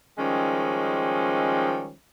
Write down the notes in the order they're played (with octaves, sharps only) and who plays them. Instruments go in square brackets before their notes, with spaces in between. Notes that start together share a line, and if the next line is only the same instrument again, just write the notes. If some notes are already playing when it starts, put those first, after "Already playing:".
[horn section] D#3 F3 G3 G#3 C#4